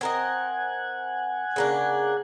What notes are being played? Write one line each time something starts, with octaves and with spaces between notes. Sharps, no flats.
C4 A#4 D#5 F#5 G#5
C#3 A#3 D4